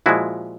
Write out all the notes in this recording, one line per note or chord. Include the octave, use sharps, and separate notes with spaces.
A#2 F3 G#3 E4 F#4